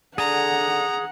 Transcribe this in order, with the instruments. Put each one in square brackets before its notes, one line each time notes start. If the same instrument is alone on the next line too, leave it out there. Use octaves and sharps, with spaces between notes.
[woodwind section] D3 [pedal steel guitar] G#4 [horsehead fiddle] F#5 [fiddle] A#5